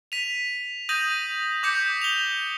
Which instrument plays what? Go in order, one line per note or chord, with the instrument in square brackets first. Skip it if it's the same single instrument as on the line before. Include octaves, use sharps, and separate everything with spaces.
[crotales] B6 D#7 F7
D#6 G6 A#6 D#7 F#7
D6 G6 B6 C#7
F7 G7